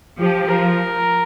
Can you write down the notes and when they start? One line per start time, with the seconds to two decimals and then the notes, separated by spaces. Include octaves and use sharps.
0.20 F3 G4
0.48 F3 A#4